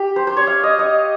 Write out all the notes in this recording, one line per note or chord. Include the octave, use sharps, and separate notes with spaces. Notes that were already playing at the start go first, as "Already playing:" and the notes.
Already playing: G4
C5
C5
C#5
F5
D#5
D#5